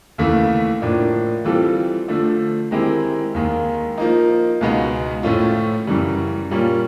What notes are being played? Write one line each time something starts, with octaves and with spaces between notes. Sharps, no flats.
D#2 C#3 E3 A3
A2 F3 A#3 D4
E3 G3 C4 F4 A4
D3 F3 A3
D#3 G#3 C4 E4 G4
D#2 D#3 G#3
F3 A#3 D#4
C#2 B2 G#3 B3 D#4
A2 F3 A3 C#4 F4
F#2 C#3 E3 G3
A#2 G3 A#3 C#4 F4